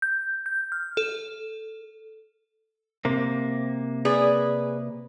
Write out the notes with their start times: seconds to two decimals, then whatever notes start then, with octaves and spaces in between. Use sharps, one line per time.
0.02 G6
0.46 G6
0.72 F6
0.97 A4
3.05 C3 A#3
4.05 G#4 B4 D5